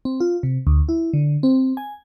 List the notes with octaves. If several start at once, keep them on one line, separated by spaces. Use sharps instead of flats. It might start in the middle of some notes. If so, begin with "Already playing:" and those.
C4
F4
C3
D2
E4
D3
C4
G#5